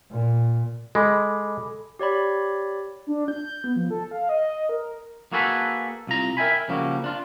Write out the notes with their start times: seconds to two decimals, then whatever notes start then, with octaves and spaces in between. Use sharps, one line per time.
0.11 A#2
0.95 G#3 A4 B5 D6
1.99 G4 C#5 D5 B5
3.07 D4
3.28 G6
3.64 B3
3.76 F3
3.91 A4
4.11 F5
4.29 D#5
4.69 A#4
5.32 A#3 F#4 G#4 A4 B4
6.07 C2 F4 A#5
6.37 A#4 E5 G5 G#5 B5
6.68 C#3 F3 G3 A#3 F#4
7.04 D4 F4